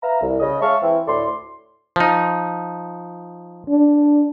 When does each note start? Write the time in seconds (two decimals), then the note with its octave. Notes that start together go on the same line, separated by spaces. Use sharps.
0.03 B4 E5 F5 A#5
0.21 C2
0.40 C#3 D#5
0.61 G#3 C#5 E5 F5 A5 C#6
0.82 E3 C4 E4
1.08 D2 A2 A4 D5 C6
1.96 F3 D#4
3.69 D4